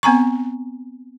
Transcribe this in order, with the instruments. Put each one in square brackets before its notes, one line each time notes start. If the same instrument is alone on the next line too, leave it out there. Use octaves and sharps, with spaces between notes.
[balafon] B3 C4 G#5 A#5 C#6